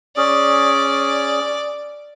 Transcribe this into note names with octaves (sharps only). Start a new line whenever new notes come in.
C#4 G#4 D5